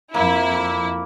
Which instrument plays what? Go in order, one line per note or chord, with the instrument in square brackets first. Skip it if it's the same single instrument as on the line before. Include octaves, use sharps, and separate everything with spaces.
[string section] F2 E4 [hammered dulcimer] A#3